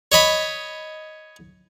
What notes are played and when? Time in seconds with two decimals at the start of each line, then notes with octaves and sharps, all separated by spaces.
0.12 C#5 D#5 B5